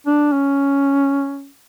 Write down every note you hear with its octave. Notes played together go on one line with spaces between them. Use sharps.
D4
C#4